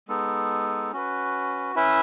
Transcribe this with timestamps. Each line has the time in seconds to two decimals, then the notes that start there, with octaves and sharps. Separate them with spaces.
0.08 G#3 B3 D#4 A4
0.92 C#4 F#4 B4
1.75 C#4 E4 B4 E5